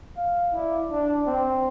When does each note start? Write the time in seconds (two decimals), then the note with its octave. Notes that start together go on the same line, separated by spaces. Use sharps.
0.17 F5
0.53 E4 D5
0.90 D4
1.27 C4